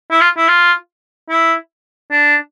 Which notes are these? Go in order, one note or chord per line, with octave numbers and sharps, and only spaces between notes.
E4
F4
E4
F4
E4
D4